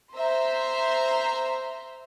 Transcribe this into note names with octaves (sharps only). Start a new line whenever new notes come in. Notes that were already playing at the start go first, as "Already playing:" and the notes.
C5 E5 A#5 C6